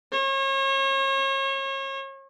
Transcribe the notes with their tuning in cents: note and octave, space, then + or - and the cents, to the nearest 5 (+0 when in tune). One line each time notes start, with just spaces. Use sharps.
C#5 -35